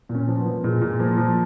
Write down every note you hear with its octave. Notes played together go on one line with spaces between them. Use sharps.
A#2
C#4
F3
B3
F3
A#2 G#3
A#2
F3 A#3
F3